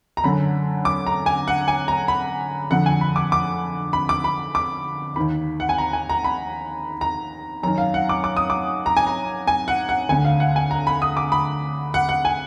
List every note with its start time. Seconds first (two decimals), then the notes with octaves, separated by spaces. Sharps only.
0.17 A#5
0.24 F#2 D3 B5
0.85 D6
1.07 A#5
1.26 G#5
1.48 F#5
1.68 G#5
1.88 A#5
2.08 B5
2.70 F2 D3 F#5
2.86 G#5
3.01 B5
3.16 D6
3.32 D6
3.93 B5
4.09 D6
4.24 B5
4.55 D6
5.16 D#2 D#3 B5
5.60 F#5
5.69 G#5
5.78 A#5
5.93 G#5
6.09 A#5
6.24 B5
7.01 A#5
7.63 F#2 D#3 A#5
7.78 F5
7.94 F#5
8.09 D6
8.24 D6
8.37 D#6
8.50 D6
8.86 A#5
8.97 G#5
9.07 A#5
9.47 G#5
9.68 F#5
9.89 F#5
10.09 D2 D3 G#5
10.25 F5
10.40 F#5
10.56 G#5
10.71 A#5
10.87 B5
11.02 D#6
11.17 D6
11.32 B5
11.94 F#5
12.09 F#5
12.25 G#5